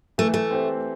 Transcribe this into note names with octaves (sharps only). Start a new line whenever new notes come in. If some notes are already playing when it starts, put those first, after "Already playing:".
E3 A3
A3
C4 G4 C5